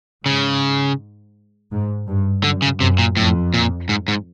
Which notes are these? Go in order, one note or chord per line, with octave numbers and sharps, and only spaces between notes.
G#2 C#3
G#2
G2
F#2 D3
C#3
F#2 C3
A#2
F2 A2
A#2
G#2
G#2